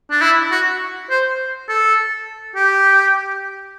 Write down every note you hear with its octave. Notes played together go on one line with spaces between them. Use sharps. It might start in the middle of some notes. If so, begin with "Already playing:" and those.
D4
E4
F#4
C5
A4
G4